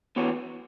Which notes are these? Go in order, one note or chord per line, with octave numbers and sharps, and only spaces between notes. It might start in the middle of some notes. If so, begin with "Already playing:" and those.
E3 B3 F#4 C#5